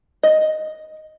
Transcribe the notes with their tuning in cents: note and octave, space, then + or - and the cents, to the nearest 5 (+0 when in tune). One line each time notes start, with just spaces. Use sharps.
D#5 +0